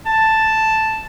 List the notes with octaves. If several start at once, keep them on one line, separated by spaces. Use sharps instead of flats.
A5